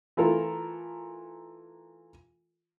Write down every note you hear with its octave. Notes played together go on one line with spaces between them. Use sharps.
E3 A3 F4 A4 A#4